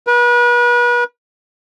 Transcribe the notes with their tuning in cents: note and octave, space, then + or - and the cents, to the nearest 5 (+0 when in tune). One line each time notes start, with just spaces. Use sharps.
B4 -35